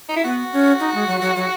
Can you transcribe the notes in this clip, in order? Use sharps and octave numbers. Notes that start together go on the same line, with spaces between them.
D#4
E4
B3 F#4
C#4
D#4
G#3
F#3
F#3
F#3